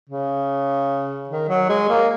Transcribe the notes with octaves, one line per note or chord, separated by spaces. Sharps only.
C#3
D#3
F#3
G#3
A#3